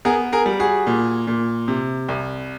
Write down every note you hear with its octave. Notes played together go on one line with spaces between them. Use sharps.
B3 G#4 A#4
G#4 A#4
G3
F#4 G#4
A#2
A#2
C3
C2